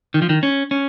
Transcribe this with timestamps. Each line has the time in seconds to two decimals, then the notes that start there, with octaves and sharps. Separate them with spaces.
0.14 D#3
0.22 F3
0.29 D#3
0.43 C#4
0.71 C#4